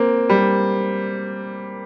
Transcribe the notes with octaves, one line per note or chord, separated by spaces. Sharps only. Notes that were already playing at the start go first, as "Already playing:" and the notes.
Already playing: A#3 C4
G3